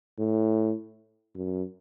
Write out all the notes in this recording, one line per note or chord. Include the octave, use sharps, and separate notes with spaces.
A2
F#2